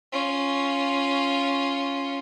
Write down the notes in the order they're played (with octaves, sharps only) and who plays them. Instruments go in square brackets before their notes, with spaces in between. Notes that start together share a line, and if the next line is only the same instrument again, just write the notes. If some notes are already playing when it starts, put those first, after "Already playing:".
[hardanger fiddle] C#4 F4